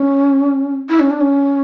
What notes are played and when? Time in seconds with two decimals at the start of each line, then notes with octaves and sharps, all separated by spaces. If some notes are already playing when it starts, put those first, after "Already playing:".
Already playing: C#4
0.89 E4
1.00 C#4
1.10 D4
1.21 C#4